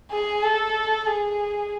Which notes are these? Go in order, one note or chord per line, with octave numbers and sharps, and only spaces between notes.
G#4
A4
G#4